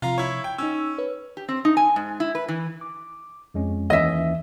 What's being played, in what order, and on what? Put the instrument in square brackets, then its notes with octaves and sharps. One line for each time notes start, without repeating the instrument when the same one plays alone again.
[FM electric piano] C3 F3 [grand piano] F4 F5 A#5
[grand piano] E4 C#5
G5
[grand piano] C#4 [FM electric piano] D#4 E6
[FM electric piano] B4 C#5
[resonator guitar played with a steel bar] G4
C4
D#4
G#5
G#2
E4
B4
E3
[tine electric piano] D6
F2 G#3 C#4
[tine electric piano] D#2 E3 C#4 [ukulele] D#5 E5